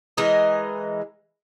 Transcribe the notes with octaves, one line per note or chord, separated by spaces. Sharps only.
E3 G#3 A#4 D#5